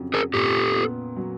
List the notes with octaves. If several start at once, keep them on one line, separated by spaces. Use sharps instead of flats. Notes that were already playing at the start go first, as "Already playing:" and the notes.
Already playing: F2 C#3 F#3
G#4 A#4
A#2 G4 A4
B3
F#3